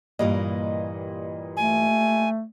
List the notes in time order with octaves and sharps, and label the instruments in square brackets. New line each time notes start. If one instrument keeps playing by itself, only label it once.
[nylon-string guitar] G2 E3 A#3 [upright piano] A#2 G3 D#5
[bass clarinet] A3 [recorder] G#5